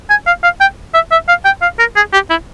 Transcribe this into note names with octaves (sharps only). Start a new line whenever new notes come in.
G#5
F5
F5
G5
E5
E5
F5
G5
F5
A#4
G#4
G4
E4